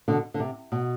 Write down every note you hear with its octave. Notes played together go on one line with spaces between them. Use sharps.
B2 D3
D3
C3
B2